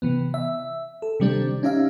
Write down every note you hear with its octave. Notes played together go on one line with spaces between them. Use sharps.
C3 E3 B3
E5
A4
C3 D#3 G3 C4 D4
C#4 D#4 G4 E5 F5